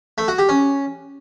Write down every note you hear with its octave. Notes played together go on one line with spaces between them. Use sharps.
A3
F#4
G4
C#4